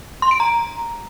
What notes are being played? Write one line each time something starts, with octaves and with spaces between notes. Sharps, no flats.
C6
D7
A#5